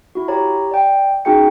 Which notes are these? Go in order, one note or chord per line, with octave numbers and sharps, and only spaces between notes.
E4 F#4
G4 C#5 A#5
D5 G5
C#4 D#4 F#4 G#4 G5 C#7